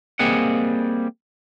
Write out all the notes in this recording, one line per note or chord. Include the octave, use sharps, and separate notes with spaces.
G3 A#3 C4 G#4 D#5 F#5